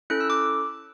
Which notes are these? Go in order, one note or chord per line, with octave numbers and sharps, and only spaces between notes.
C#4 E4 A4 F#6
E6
D6